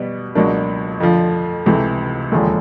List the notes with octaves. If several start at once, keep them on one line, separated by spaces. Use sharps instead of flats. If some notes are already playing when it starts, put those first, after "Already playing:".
Already playing: B2 G3 B3
C#2 B2 F#3 A#3 D4
F2 D3 F3
C#2 C3 E3 A3
E1 D#2 D3 F3 G#3